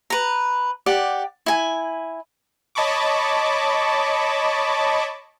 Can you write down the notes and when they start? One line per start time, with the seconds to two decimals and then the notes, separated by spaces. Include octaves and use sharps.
0.10 B4 A#5
0.86 G4 D5 F#5
1.46 E4 G#5
2.75 C#5 D#5 A5 B5 C#6 D6